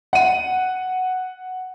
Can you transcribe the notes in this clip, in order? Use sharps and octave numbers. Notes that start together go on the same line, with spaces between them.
F#5 D#7